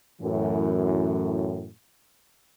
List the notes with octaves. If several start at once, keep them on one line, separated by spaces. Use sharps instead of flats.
F#2 A2 E3